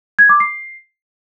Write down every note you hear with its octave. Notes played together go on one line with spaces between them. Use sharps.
G#6
D6
C7